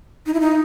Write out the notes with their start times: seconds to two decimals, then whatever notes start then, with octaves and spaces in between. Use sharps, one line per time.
0.26 D#4
0.34 E4
0.40 D#4